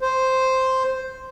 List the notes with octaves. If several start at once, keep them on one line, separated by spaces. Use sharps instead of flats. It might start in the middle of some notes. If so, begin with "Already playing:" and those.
C5